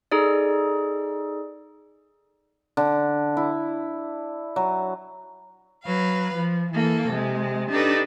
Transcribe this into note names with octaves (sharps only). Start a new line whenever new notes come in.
D#4 G#4 A4 D5
D3
E4
F#3
F#3 B4 F5
F3
E3 A#3 A4
C3 G#3
D4 D#4 G4 A4 B4